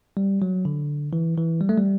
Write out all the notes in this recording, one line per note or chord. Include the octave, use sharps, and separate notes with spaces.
G3
F#3
D3
E3
E3
G3
A3
G3